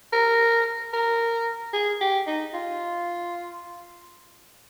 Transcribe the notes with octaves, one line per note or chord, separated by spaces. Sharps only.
A#4
A#4
G#4
G4
D#4
F4